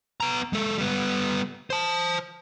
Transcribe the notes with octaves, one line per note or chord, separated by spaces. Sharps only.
B3 A#5
G#3 A4
G3 B3
C5 A5